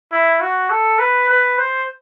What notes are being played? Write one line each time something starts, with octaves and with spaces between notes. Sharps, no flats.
E4
F#4
A4
B4
B4
C5